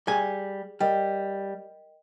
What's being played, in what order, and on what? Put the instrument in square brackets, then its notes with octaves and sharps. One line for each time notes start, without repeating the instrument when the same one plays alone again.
[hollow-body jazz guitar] G3 G#5 [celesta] G#4
[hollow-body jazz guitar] G3 [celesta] A#4 D#5 G5